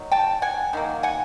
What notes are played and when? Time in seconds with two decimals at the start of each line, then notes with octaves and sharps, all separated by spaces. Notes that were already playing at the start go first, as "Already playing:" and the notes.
Already playing: D#3 F#3
0.12 G5 A5
0.42 F#5 G#5
0.73 D#3 F#3 A#3
1.03 F#5 G#5